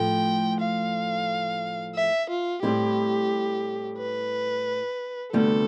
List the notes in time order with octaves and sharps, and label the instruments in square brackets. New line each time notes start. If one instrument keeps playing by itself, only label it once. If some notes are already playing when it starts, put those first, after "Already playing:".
Already playing: [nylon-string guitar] A2 F3 A3 [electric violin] G5
[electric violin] F5
E5
F4
[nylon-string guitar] A2 G3 C4 E4 [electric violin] G4
[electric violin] B4
[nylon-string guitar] D2 C3 G3 B3 [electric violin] A4